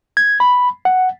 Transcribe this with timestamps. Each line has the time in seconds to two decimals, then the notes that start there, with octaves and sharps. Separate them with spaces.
0.17 G#6
0.40 B5
0.85 F#5